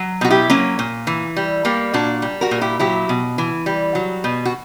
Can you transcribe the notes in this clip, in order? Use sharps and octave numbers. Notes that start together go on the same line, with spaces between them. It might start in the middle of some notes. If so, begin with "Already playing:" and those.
Already playing: F#3
B2 F#4
E4 G4
F#3 A#3 C#4
A#2
E3
G3
G3 A#3
A#2 D4 F#4
G3
F#4 A#4
A#2
E4 G4
F#3 E4 G4
B2
E3
G3
F#3
B2
F#4